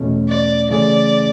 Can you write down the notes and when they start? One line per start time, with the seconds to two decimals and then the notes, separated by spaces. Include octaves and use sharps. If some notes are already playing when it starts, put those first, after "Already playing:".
Already playing: E2 B2 A3 C#4
0.28 D5
0.69 C#3 E3 A3 C#4 G#4 D5